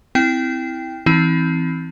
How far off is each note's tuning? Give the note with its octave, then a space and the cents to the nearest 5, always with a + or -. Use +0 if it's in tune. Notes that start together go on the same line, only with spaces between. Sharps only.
C4 -25 E4 -15 G5 +5
E3 +5 C4 +0 D#4 +45